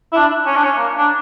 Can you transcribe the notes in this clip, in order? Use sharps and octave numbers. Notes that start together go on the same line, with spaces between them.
E4
D4
C#4
D4
C#4
A#3
D4